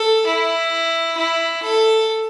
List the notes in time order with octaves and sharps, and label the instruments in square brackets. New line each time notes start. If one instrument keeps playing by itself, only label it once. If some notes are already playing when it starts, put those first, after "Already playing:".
Already playing: [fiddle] A4
E4
E4
A4